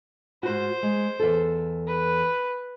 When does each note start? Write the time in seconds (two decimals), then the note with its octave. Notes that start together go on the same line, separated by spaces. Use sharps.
0.43 G#2 F#4 C5
0.83 G#3
1.20 E2 A4
1.87 B4